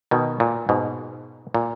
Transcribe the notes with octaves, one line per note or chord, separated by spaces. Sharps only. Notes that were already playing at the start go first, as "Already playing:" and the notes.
B2 D#3
A#2
G#2 B2
A#2